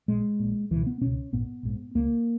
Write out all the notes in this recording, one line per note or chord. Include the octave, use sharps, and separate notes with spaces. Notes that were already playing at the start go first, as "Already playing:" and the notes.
A#1 A#2 G#3
A#1 A#2
C#2 B2 E3
B3
C#2 B2 C#4
A#1 G#2 B3
A#1 G#2
C#2 C#3 A#3